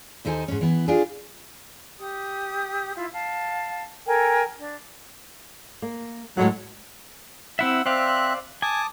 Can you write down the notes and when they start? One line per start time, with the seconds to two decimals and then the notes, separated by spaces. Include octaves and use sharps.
0.25 D#2 D#4 A4 C5 G#5
0.48 G#2 C#4
0.61 E3 B3
0.88 D4 F4 G4 G#4
1.99 G4 D#6
2.95 E4 F4 E5
3.14 F5 A5
4.06 A4 A#4 G5 G#5
4.58 D4
5.82 A#3
6.37 A2 F#3 G#3 F#5
7.59 C4 E4 E5 F#5 E6
7.86 C4 C5 D5 E5 F5 F#6
8.62 G#5 A5 D6 D#6